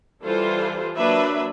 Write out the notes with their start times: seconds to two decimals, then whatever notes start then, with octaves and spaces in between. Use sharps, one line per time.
0.24 E3 G3 F4 A4 B4 C5
0.96 F#3 A#3 D4 B4 E5 B5